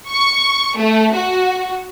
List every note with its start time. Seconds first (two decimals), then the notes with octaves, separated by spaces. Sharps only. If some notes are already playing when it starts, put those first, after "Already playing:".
0.11 C#6
0.78 A3
1.16 F#4